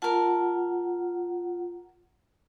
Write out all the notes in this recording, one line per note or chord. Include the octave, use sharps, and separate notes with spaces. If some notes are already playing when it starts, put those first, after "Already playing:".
F4 A#4 F#5 A5